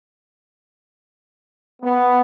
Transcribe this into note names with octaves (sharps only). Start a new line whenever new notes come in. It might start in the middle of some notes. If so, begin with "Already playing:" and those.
B3